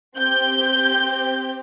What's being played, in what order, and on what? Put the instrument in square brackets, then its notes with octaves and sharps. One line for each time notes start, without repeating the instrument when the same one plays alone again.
[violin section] C4 G4 G6